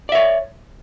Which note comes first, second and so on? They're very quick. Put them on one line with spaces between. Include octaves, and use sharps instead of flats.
D5 E5 C#5